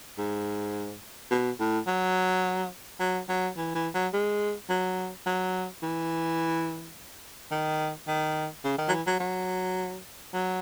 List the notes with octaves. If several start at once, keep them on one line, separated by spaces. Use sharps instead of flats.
G#2
B2
A2
F#3
F#3
F#3
E3
E3
F#3
G#3
F#3
F#3
E3
D#3
D#3
C#3
D#3
F#3
E3
F#3
F#3
F#3